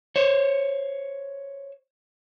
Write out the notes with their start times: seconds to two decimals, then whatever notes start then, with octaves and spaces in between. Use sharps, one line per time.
0.16 C5 C#5